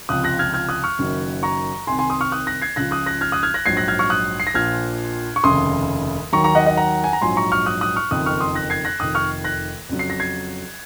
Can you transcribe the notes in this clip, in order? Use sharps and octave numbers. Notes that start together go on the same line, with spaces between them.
C#2 C3 F3 D#6 F#6
F#6 A#6
F6 G#6
F6 G#6
D#6 F#6
C#6 F6
F#1 F#2 D#3 F#3
A#5 C#6
C2 C3 D#3 G#5 C6
G#5 C6
C6 D#6
C#6 F6
D#6 F#6
F#6 A#6
G#6 C7
C#2 C#3 F3 F#6 A#6
D#6 F#6
F#6 A#6
F6 G#6
D#6 F#6
F6 G#6
F#6 A#6
A#1 G#2 F#3 G#6 C7
F#6 A#6
F6 G#6
C#6 F6
D#6 F#6
C7
A#6
A#1 A#2 F3 F6 G#6
C#6
F1 D#2 C#3 C6 D#6
D#2 D#3 F#3 A#5 C#6
A#5 C#6
D#5 F#5
D#5 F#5
F#5 A#5
G#5
A#5
A#1 G#2 F#3 G#5 C6
A#5 C#6
C#6 F6
D#6 F#6
D#6 F#6
C#6 F6
F#1 F2 D#3 D#6 F#6
C#6 F6
C6 D#6
F#6 A#6
G#6 C7
F#6 A#6
F1 F2 D#3 D#6 F#6
C#6 F6
F#6 A#6
F2 C#3 F#3
C7
A#6
G#6 C7